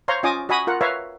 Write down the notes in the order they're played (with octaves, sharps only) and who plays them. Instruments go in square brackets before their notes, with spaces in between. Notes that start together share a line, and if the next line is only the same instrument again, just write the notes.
[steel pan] C5 C#5 F5 A#5 C6
C#4 F4 D#5 G#5 D6 D#6
F#4 D#5 G#5 B5 D#6
F4 A#4 F#5
B4 C#5 E5 F5 A#5